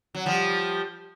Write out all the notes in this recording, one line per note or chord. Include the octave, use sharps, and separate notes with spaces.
F#3
F3 G3